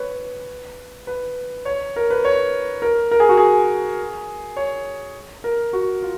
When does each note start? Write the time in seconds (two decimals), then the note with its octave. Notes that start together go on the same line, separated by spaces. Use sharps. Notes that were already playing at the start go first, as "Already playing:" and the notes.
Already playing: B4 C#5
1.07 B4
1.65 C#5
1.96 A#4
2.10 B4
2.25 C#5
2.82 A#4
3.11 A#4
3.20 G#4
3.29 F#4
3.37 G#4
4.56 C#5
5.44 A#4
5.73 F#4
6.02 F4